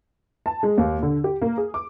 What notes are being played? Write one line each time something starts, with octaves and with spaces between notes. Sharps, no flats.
A5
G#3
D#2
D3
G4
A#3
G#4
D6